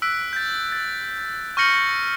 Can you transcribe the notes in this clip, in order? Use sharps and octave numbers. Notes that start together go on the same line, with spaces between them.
E6 F#6 B6 D7
G6 A6
A6
C#6 F6 G6 A#6 C#7 F#7